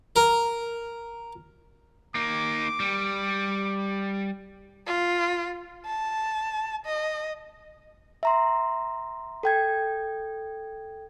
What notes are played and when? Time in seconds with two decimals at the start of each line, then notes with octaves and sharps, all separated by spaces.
0.16 A#4
2.15 A#3 D#4 D6
2.80 G3
4.86 F4
5.86 A5
6.85 D#5
8.23 E5 A#5 C6
9.43 A4 G5 G#6